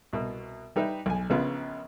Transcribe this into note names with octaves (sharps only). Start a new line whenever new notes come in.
C2 B2
G3 D#4 B4 E5
B1 G#5
A#1 C#3 B3 F4